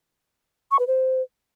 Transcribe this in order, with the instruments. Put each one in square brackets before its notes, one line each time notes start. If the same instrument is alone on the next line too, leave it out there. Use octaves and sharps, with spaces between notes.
[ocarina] C#6
B4
C5